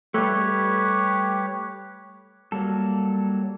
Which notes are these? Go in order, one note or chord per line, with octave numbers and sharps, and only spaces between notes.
G3 A3 G4 B4 C#5
F#3 G3 A#3 A4